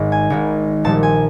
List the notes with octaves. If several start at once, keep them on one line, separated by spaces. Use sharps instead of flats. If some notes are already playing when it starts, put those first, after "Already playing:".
Already playing: G#1 G#2 D#3 G#3
G#5
G#1 G#2 D#3 G#3
A#1 A#2 G3 A5
G#5